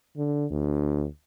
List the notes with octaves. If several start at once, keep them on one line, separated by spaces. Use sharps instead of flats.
D3
D2